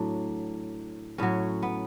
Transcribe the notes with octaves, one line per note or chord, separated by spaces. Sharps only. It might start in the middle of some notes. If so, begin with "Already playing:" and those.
Already playing: A2 F#3 D4
A2 F#3 C#4
B3